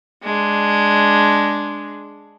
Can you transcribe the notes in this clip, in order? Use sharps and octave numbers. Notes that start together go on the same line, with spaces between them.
G#3 D4